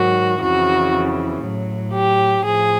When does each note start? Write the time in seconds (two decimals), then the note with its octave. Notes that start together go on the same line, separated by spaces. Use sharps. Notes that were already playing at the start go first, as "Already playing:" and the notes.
Already playing: G#2 D#3 F#3 F#4
0.41 F2 C#3 E3 F#4
1.43 A2 F#3
1.94 G4
2.44 A2 F3 G#4